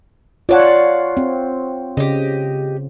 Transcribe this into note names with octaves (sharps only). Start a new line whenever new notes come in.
F4 C#5 D5 F#5 A5
C4
C#3 G4 D#5